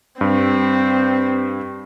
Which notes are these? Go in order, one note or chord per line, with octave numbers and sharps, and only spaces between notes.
G2 C4